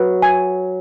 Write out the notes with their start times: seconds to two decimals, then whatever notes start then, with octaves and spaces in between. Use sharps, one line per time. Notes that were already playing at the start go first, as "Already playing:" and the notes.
Already playing: F#3 B4
0.22 G#5